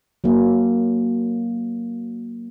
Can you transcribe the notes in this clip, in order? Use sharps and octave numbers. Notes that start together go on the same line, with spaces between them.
F#3 A#3